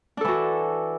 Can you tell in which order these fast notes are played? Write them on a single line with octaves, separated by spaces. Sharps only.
D4 A4 E3 F#4